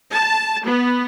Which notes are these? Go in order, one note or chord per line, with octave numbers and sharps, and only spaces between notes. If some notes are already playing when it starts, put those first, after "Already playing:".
A5
B3